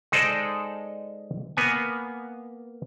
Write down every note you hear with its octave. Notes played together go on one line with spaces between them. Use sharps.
G#3 D#4 A4 C5 D5
A#3 B3 G#5